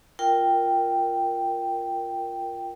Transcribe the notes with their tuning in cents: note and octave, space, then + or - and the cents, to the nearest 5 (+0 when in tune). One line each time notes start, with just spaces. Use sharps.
F4 +0 A#4 -5 G5 +0